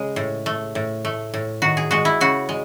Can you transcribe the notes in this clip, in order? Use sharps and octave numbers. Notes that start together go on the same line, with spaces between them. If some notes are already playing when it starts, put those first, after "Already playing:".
Already playing: C#3 G#3
A2
A3
A2
A3
A2
D#3 F#4
G#4
G#3 F#4
E4
C#3 F#4
G#3